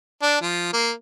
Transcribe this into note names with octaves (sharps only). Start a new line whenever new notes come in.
D4
F3
A#3